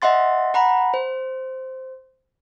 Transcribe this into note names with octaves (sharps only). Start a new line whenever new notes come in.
D#5 E5 F#5 C6 A6
F#5 A#5 B5
C5